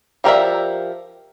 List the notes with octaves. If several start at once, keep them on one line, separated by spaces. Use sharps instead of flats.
F3 G4 A#4 D5 E5